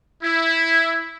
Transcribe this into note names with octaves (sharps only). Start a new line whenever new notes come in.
E4